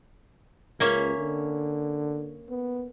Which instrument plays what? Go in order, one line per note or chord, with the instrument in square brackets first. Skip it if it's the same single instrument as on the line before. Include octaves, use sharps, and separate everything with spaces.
[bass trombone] C#2 [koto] A#3 C#4 E5
[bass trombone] D3
B3